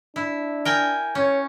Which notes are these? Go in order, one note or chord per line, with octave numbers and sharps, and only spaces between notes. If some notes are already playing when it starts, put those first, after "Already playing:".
D4 E4
A#4 G5 G#5
C#4 C#5